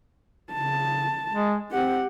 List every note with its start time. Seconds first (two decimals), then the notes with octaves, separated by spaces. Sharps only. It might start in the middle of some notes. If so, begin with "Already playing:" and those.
0.53 C#3 A5
1.32 G#3
1.71 C4 G4 F#5